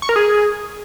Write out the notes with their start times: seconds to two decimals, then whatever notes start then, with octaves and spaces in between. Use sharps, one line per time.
0.02 C#6
0.09 A#4
0.16 G#4